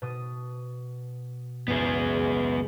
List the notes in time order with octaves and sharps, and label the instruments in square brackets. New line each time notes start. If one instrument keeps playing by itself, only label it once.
[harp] B2 D#6
[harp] F#1 C#2 F#2 [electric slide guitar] B3 G#4